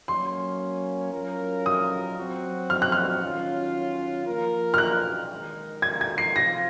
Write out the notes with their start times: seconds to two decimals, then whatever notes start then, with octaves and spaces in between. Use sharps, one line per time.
0.08 F#3 A#3 C#4 C6
1.13 F#3 C#4 F4 A#4
1.66 D#6
2.18 F#3 C4 F#4
2.70 F6
2.82 F#6
2.92 F6
3.22 D#3 F#3 C#4 F4
4.26 F3 A#3 F4 A#4
4.74 F6
4.78 F#6
5.31 D#3 G#3 D#4 A#4
5.82 G#6
6.01 G#6
6.18 C7
6.35 C3 F3 C4 F4 A#6